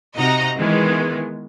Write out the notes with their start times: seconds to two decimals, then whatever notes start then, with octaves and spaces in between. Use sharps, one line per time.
0.17 C3 D#4 F#4 D#5 A#5 A#6
0.57 D#3 E3 G#3 B3